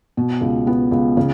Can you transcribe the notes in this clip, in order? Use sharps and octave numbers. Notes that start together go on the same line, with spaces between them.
B2
C#2
B3
C#2
C#3